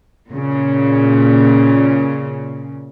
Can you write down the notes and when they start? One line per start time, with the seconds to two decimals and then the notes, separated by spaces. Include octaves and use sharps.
0.30 A#2 C#3